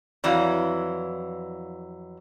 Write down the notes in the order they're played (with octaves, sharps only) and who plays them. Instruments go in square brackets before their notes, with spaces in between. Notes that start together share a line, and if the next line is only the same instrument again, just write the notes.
[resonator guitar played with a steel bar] F2 E3 F#3 [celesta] D5 F5